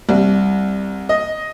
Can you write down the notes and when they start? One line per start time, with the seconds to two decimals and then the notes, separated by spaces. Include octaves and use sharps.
0.09 C2
1.09 D#5